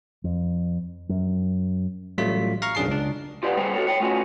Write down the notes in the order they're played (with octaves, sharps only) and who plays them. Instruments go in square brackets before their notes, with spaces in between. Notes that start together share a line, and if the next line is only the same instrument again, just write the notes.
[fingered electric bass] F2
F#2
[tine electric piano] A1 F#3 G3 A3 F4 B6
F5 A#5 C#6 F6
B1 F#2 D4 G#4 A5 C7
C#2 D4
[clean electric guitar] F4 G4 B4 D5 F#5
G3 A#3 B3 G#4 C5 G5
F#4 A4 C#5
C#5 G5
A3 B3 C#4 F4 F#4